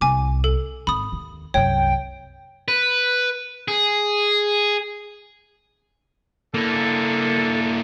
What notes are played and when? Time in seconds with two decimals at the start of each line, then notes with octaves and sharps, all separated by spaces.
0.01 C2 G#5 D6
0.44 A4
0.87 G#1 B5 D#6
1.12 D#2
1.54 C2 F#2 C#5 G5
2.68 B4
3.68 G#4
6.54 D3 A#3 E4 A4